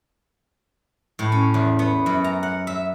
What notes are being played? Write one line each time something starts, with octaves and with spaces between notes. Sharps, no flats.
A2
C#4
E2
B3
F#2
A#5
F#5
E5